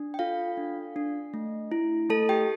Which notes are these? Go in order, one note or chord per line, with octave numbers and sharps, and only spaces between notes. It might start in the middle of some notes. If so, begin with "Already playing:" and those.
Already playing: D4
G5
F4 A4 F5
D4
D4
A3
E4
A3 A4 A5
G4 G5